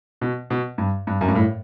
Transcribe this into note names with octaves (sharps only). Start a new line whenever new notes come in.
B2
B2
G2
G2
F#2
G2
A2